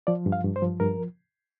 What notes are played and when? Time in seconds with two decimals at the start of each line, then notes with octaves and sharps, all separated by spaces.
0.07 F3 D5
0.26 G2
0.32 F5
0.44 G2
0.56 C5
0.62 F3
0.80 G2 A#4